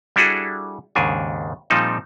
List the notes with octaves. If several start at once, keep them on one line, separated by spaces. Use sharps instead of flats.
G3 D4 E4 F#4 G#4 A4
D#2 G#2 C#3 D4 G#5
A#2 F3 G3 C4 D#4 A4